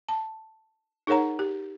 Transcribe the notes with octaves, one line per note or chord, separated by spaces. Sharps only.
A5
D#4 G#4 A#4 C#5 F#5 A#5
G4